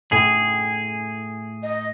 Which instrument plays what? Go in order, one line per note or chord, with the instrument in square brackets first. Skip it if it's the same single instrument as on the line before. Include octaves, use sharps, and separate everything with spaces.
[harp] A2 [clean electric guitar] G#4
[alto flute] D#5